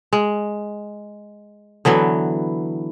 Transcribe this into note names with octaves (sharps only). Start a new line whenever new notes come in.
G#3
D3 E3 F#3 B3